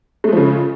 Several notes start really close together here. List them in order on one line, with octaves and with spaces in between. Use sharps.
A3 G#3 F3 C#3